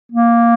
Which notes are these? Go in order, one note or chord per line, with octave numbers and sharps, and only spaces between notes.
A#3